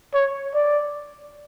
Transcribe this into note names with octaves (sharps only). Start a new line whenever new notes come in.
C#5
D5